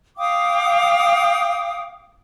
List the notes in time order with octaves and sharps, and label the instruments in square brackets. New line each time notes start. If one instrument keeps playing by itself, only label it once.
[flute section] F5 G5 D6 D#6